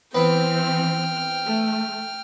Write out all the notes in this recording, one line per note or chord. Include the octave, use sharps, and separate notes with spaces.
E3 B3 C4 B4 G5 F6
A3